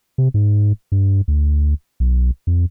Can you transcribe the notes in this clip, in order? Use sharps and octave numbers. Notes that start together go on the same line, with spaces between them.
C3
G#2
G2
D2
B1
F2